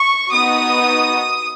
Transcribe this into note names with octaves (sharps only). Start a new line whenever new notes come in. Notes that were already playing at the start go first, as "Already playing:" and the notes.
Already playing: C#6
B3 D#4 F#4 D#6